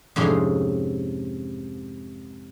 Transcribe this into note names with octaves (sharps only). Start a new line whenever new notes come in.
F2 G#2 C3 C#4 G#4 C6